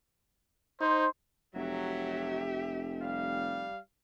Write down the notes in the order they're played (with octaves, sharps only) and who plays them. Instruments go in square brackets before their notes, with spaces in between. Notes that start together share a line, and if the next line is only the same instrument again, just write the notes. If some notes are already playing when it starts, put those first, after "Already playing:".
[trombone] D#4 [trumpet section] C5
[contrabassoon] F1 [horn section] F#3 [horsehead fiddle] G4 E5
[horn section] G3 F5